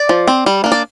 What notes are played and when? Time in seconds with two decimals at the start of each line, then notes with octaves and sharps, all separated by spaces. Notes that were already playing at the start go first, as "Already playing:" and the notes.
Already playing: D5
0.09 F3
0.27 C4
0.46 G3
0.64 A#3 D4
0.72 D5